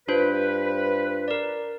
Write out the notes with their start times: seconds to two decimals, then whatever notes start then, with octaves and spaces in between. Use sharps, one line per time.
0.08 G2 D4 F4 B4 C5
1.28 A#4 D5